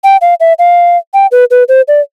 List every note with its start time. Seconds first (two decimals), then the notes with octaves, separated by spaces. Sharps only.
0.04 G5
0.21 F5
0.40 E5
0.59 F5
1.14 G5
1.32 B4
1.51 B4
1.69 C5
1.88 D5